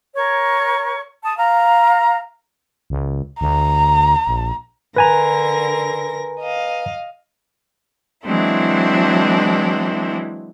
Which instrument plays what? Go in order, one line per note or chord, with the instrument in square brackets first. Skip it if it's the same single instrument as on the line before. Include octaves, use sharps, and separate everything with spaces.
[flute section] A#4 C#5 C#6
A5 D#6
F5 A#5
[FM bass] C#2
[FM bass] D2 [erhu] A#5
[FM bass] A#1
[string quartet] D3 A#4 A#6 [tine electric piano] B4 G#5 A#5
[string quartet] D#5 F5
E3 F#3 G#3 C4 D4 E4